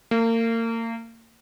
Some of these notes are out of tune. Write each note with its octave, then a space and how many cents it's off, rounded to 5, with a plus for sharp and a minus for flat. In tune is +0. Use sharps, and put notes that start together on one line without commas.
A#3 -35